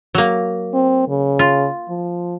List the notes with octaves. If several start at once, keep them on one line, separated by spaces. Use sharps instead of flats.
F#3 A#3
C4
C#3
F4
F3